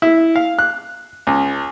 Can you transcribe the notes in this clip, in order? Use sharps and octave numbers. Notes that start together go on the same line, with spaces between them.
E4
F5
F#6
C#2